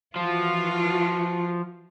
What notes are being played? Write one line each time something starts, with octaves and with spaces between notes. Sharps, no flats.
E3 F3 F4 F#4